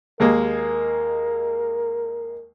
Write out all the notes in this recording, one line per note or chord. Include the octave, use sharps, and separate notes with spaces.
D#2 G#3 A#3 A#4